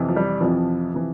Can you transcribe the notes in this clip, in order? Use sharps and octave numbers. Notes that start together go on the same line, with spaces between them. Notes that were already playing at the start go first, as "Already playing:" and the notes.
Already playing: F2 C3 E3
F3
G3
F2 C3 E3 F3
C3 E3